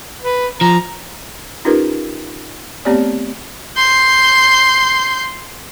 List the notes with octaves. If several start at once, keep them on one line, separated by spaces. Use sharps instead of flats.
B4
F3 A#5
C#4 D#4 F4 G4 A#4 B4
A3 B3 C4 G4 C#5 D5
C6 G6